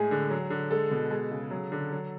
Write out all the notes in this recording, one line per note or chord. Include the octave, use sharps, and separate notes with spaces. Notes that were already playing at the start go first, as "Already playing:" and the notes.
Already playing: A2 G#3 G#4
D3
F#3
D3
G#3 A4
B2
G#3
C#3
F#3
D3
F#3